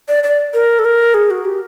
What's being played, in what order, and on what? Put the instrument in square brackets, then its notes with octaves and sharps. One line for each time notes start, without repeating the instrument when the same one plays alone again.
[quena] D5
D5
A#4
A4
A#4
G#4
F#4
G4